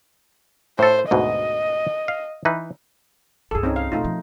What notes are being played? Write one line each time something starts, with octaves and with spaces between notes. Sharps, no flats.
A2 A4 C5
D2 G#2 B2 D#5
F5
E3 D#4 B4
C2 G2 G#4 A4
C4 C#4 D#4
F5
E2 B2 A3 D#4 F4
F3